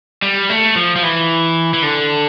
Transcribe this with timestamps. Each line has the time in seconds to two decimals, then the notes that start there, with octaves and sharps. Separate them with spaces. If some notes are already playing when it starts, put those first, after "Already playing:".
0.22 G3
0.49 A3
0.76 F3
0.96 F3
1.03 E3
1.74 E3
1.83 D3